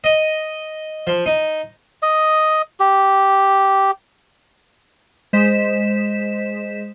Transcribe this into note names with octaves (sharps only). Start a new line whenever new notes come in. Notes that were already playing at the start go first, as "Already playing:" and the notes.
D#5
F3
D#4
D#5
G4
G#3 C5 D#5 B6 E7